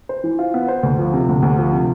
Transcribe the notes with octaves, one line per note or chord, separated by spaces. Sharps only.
C5
E3
F4
B3
C5
D2
F3
C3
D2
D2
F3
C3